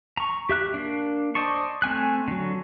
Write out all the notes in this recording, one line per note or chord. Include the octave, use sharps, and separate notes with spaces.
A#5 C#6
G4 E5 F#6
A#3 D4
C5 D5 D#5 A5 C#6
A3 C4 G#5 F#6
D3 F#3